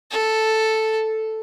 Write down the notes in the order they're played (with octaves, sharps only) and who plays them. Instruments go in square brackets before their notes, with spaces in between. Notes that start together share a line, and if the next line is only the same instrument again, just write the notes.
[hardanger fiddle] A4